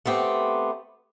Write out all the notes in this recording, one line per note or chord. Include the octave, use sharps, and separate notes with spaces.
A3 B3 C4 G4